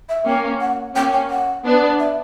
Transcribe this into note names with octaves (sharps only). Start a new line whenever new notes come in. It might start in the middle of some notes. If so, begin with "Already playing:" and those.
E5
A#3 C#4 G5
F#5
A#3 C#4 G5
G5
F#5
B3 D4
E5